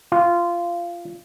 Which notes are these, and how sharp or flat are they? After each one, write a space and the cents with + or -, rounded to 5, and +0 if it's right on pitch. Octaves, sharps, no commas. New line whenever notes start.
F4 -15